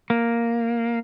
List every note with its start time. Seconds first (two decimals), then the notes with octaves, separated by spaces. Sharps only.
0.10 A#3